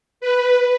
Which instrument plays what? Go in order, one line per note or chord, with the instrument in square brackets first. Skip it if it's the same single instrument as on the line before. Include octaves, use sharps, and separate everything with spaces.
[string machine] B4